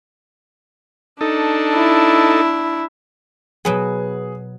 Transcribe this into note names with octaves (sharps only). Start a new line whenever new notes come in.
D4 D#4 A4
E4
B2 F#3 B3 G#4